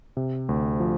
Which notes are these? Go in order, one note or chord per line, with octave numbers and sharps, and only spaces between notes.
C3
D2
F3